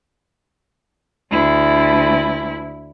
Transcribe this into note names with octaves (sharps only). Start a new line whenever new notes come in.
D2 E4